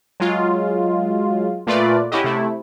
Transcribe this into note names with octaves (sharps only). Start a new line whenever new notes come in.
F#3 G#3 F4
A#2 A3 F4 B4 D5
C#4 E4 F#4 G4 D#5
C3 A3 E4